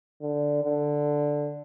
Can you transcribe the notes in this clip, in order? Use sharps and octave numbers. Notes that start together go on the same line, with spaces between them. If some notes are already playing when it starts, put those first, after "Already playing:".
D3
D3